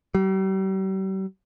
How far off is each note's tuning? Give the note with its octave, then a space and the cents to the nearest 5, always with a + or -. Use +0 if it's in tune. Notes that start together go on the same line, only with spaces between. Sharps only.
G3 -40